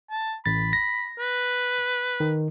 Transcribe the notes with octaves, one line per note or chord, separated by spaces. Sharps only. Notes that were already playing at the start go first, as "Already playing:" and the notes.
A5
A1 B5 A6
A#6
B4
D#3